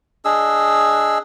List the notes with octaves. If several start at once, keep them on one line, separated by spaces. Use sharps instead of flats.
D4 G#4 D#5 E6